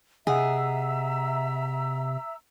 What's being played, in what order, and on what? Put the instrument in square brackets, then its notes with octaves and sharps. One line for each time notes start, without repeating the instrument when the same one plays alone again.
[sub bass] C3 [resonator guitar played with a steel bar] G#4 [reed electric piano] D#5 F#5 [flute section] E5 A#5 E6